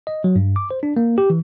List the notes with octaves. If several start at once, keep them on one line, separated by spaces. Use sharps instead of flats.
D#5
F#3
G2
D6
C5
D4
A#3
G4
E3